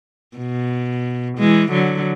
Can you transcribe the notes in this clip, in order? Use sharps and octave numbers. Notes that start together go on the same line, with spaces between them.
B2
E3 G#3
D3 F#3